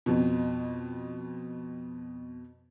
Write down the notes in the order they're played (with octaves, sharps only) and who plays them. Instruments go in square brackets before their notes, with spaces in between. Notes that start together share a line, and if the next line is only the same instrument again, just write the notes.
[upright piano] F2 B2